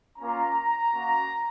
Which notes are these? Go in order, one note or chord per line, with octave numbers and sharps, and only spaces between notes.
A#3 C#4 F4 A#5
A#3 C#4 F#4